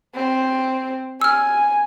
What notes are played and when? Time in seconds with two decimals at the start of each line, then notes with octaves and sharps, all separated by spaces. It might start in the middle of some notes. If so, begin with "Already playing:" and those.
0.15 C4
1.21 G#5 E6 F6